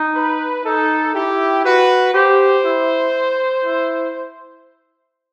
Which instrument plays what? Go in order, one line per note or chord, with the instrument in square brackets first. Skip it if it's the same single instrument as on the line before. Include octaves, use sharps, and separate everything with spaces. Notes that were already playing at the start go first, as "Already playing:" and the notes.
Already playing: [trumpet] D#4
[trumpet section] B4
[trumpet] D#4 [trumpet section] A4
[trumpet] E4 [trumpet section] G4
[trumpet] F#4 [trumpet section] B4
[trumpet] G4 [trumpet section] C5
[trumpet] E4
E4